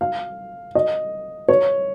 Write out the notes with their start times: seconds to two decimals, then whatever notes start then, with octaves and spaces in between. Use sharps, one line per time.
0.01 F5
0.75 D#5
1.48 C#5